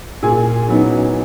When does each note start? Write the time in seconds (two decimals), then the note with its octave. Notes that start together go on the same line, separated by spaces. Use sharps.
0.23 A#2 G#4 G#5
0.68 F#3 B3 D#4